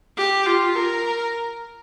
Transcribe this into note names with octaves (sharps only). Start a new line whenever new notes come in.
G4
F4
A#4